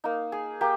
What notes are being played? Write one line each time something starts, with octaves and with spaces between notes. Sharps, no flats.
A#3 D#4
G#4
A#3 G4